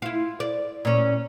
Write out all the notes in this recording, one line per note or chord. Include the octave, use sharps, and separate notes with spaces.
E4 F4
D5
A#2 C#4